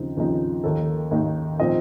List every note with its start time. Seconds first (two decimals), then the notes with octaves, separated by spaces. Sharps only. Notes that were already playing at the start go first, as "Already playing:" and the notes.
Already playing: D#2 C#3 F3 C4 D#4
0.17 D#2 C#3 F3 C4 D#4
0.64 D#2 D#3 A#3 D#4 A4
1.11 D#2 D#3 A#3 D#4
1.59 A#2 F3 C4 D#4 D#5